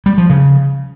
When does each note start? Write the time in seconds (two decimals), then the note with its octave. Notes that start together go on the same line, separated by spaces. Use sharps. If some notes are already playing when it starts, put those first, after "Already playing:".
0.06 G3
0.18 F3
0.30 C#3